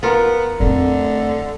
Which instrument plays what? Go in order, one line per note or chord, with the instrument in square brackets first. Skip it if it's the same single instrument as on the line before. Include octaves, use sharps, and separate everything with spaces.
[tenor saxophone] B3 [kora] F4 A#4
[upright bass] F2 A3 [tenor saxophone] D3